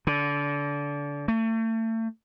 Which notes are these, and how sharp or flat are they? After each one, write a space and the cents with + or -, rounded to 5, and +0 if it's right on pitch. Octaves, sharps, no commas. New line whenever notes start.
D3 -25
A3 +35